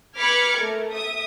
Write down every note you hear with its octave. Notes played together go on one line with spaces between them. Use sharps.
B4 B5 D6 F6 G#6 C#7
A3 A#4
E5 D#6